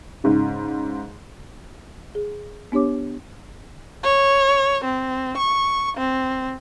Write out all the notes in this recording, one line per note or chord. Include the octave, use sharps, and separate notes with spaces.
G#2 C#3
G#4
B3 D4 G4 C#5 D6
C#5
C4
C#6
C4